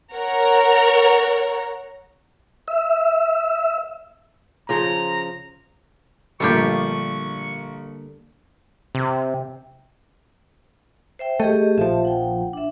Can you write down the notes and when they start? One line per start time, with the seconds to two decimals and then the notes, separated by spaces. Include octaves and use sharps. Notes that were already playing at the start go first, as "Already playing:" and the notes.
0.13 A#4 C#5 F#5 A#5
2.68 E5
4.69 C#3 F3 C5 A#5
6.40 A#1 D3 G3 A3 A#3 F4 G4 C#6
8.95 C3
11.19 C5 E5 G5
11.40 A3 G4 G#4 D#5
11.78 A#1 F3 E5 A5
12.05 F#5 G5
12.53 D4 E5